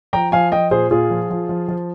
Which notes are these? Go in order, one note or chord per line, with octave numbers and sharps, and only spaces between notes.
F3 G5 A#5
F3 F5 G#5
F3 D#5 G5
A#2 G#4 C5
A#2 F4 G#4
F3
F3
F3
F3